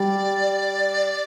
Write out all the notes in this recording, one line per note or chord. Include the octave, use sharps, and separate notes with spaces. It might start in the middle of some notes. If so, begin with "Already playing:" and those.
Already playing: G3 D5